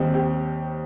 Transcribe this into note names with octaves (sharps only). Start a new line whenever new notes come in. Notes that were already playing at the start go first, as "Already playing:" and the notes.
Already playing: D#2 D#3 G3 C4 D#4
G4